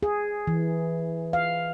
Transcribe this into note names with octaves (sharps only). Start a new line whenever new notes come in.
G#4
E3
F5